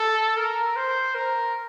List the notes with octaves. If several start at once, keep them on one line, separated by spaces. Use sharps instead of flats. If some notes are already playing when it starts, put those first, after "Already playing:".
Already playing: A4
A#4
C5
A#4